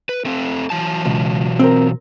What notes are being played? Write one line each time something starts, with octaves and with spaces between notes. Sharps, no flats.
B4
A3 C4 A4
E3 F#3 A5
C#2 B2
C4 A#4